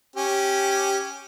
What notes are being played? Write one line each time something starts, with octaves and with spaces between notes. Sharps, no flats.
C#4 G4